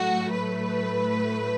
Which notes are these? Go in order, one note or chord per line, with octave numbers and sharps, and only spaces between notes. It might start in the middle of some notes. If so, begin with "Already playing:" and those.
Already playing: A2 F#3 A3 F#4
B4